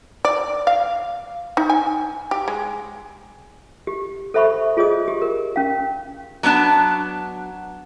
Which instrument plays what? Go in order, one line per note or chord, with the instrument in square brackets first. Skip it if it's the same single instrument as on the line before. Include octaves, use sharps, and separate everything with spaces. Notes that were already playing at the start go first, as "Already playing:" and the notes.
[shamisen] D5
F5
D#4
G#5
G4
G#3
[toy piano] G4
A4 C5 E5 B5 C#6
F4 G#4 C#5 D#5 D#6
G4
A#4
C#4 F5
[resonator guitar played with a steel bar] F#3 B3 D4 A5